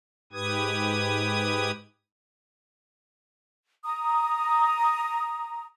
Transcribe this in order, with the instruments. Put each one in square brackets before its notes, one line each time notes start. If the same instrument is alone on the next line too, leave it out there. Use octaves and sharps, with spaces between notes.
[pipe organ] G#2 G4 B4 D#6 G#6
[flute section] A#5 D#6